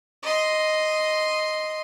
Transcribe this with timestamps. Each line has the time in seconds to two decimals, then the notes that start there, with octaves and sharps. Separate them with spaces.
0.22 D#5 C6